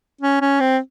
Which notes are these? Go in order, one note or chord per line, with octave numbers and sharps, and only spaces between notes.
C#4
C#4
C4